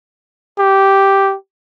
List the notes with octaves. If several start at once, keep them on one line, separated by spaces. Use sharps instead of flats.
G4